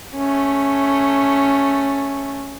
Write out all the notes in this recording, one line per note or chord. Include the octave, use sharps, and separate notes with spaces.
A3 C#4